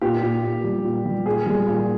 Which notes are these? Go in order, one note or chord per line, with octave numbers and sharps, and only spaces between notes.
A#2 G4
A#2
A#2
G3
A#2
G3
A#2 G#4
G3
A#2